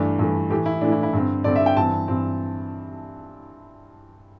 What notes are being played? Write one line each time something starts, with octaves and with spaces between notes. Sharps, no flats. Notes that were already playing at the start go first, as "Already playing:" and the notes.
Already playing: G2 E3 A3 D4
G2 E3 A3
A2 E3 A3 G4
E4
A2 E3 A3 D4
E4
E4
G2 D3 C4
G2 D3 C4 D5
E5
G5
G2 E3 C4 A5
G2 E3 C4